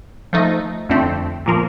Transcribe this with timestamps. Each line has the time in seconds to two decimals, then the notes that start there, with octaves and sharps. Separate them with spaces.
0.33 F3 A3 D#4
0.89 F2 D3 A3 C4
1.46 A#2 F3 A#3